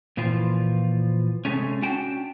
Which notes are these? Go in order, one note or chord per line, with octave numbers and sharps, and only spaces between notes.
A#2 E3 F3 F4
C3 G#3 A3 C#4
C#4 D4 F#4 G5 A5